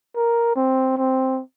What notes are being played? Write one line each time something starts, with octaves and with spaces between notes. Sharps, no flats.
A#4
C4
C4